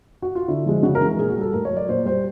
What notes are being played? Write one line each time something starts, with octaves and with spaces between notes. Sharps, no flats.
F#4
F4
D3 E4
F3 G#3
C#3 F#4
A#4
E3 G#3
A#2 G#4
F#4
G3
A4
A2 A#4
C#5
F#3
D5
A#2 C5
G3 C5